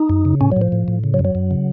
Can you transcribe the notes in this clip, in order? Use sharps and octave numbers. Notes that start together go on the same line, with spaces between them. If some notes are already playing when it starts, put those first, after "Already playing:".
Already playing: D#4
F#2
C#3
A2 C#4
F#3
A2
F3
A2
A2
C#3
F#3
F#2
F#3
F#2
C#3